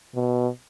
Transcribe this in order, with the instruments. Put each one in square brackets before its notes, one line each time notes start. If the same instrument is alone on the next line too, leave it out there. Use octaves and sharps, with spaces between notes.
[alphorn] B2